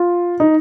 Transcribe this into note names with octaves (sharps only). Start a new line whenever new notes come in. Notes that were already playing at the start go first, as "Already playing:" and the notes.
Already playing: F4
D#4